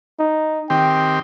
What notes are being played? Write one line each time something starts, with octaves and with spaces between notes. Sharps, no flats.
D#4
D#3 C4 G4 G5